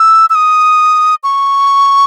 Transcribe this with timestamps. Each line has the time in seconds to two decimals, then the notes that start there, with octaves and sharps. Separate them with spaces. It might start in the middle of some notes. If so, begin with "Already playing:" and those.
Already playing: E6
0.30 E6
0.35 D#6
1.24 C#6